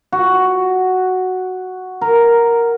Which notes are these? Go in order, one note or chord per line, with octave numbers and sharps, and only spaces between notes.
F#4
A#4